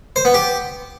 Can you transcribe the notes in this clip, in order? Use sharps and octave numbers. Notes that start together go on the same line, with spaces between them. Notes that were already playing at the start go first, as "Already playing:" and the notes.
C5
B3
G4